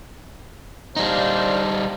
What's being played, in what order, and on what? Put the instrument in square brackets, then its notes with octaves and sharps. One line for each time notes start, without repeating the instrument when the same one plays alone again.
[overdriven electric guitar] G3 D#4 [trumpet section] D4 C5 F5